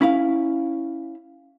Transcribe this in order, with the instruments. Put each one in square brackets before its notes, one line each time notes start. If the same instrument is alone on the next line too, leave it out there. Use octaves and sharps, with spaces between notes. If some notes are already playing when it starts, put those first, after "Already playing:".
[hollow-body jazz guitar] C#4 E4 A#4 F5